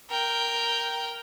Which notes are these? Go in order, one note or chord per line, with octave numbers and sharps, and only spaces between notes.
A#4 G5